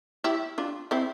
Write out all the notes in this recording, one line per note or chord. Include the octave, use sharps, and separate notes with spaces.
E4 G4
D4 F4
C4 E4